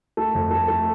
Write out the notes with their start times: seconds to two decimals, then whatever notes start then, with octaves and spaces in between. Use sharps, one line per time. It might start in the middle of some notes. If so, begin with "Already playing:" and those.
0.17 A3
0.35 F2
0.51 A3
0.68 A3